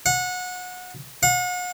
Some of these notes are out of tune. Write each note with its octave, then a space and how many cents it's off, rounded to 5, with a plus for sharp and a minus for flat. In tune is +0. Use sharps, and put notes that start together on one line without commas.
F#5 -25
F#5 -40